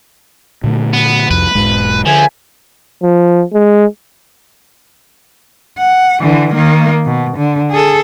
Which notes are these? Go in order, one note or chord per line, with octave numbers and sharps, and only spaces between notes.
A#2 D3 A3
B3
C2 F2 B4
E1 G#2 G#3
C#2 D3 F3 E5 G#5
F3
G#3
F#5
D3 E3
D#3 A#3
B2
D3
G#4 A4